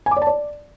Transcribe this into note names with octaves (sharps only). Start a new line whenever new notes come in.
G#5
D6
D5
A5
D5